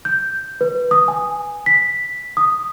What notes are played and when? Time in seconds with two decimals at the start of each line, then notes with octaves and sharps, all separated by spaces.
0.05 G6
0.61 B4
0.91 D#6
1.08 G#5
1.66 B6
2.37 D#6